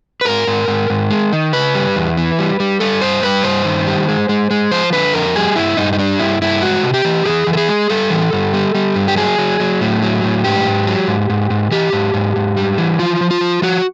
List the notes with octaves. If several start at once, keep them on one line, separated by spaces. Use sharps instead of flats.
B4
G#2 A#4
G#2
G#2
G#2
G#3
D#3
C#3 B4
G3
E2
E3
G3
G3
G3 A4
G2 C5
G3 B4
G2 C5
D#3
G3
G#3
G#3
G#3
F3 C5
D3 B4
F2 A#4
G3 G#4
G2 E4
G2 D#4
D#4
G3 D4
G2 E4
G2 E4
G#3 F#4
C3
G4
E3
E3 G#4
E3
A4
G#4
G#3
G3 A4
E3
G2
G3
G3
G2
G4
F#3 G#4
F#3
F#3
A2
F#3
A2
G#2 G4
G#2
F#3
G#2
G#2
G#2
E3 G4
G#2
G#2
G#2
G3
E3
F3 F4
F3
F4
F3
F3 F#4